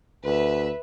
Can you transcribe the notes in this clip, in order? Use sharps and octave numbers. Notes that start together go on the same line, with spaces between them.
D2 B4 E5